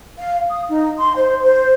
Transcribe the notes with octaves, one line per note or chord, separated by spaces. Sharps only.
F5
D#6
D#4
C6
C5
C5